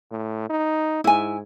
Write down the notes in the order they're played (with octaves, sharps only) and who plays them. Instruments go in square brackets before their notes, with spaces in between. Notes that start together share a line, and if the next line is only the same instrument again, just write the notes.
[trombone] A2
D#4
[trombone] G#2 [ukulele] E4 G#5